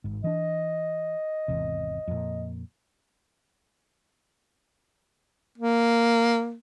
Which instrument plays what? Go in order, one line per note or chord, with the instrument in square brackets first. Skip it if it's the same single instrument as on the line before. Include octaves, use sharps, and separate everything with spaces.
[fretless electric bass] G#1 G#2
[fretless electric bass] E3 D4 [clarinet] D#5
[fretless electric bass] G#1 E2 C3
F2 A#2
[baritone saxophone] A#3